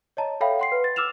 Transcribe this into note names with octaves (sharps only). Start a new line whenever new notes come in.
C#5 D#5 A5 A#5
A4 C#5 E5 F5 G5 B5
F#5 C6 C7
B4
A6
D6 E6 F6 E7 F7